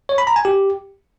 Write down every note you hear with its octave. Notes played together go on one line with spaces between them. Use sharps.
C#5
B5
A#5
G#5
G4